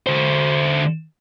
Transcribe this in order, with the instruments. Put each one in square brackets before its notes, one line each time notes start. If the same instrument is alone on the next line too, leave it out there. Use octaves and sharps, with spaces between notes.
[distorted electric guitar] D3 C5